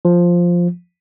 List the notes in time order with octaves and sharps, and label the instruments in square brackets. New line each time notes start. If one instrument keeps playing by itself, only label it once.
[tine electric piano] F3